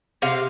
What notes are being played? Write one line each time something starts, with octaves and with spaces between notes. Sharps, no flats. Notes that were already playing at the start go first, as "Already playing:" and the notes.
C3 F5